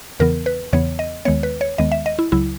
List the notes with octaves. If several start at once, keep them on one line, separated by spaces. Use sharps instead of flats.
E2 C#3 E3 B3 A#4
B4
E2 C#3 E3 B3 C#5
D#5
D#2 D#3 G#3 B3 C#5
B4
C#5
D#2 D#3 G#3 B3 D#5
E5
D#5
E4
C#2 C#3 F#3 E4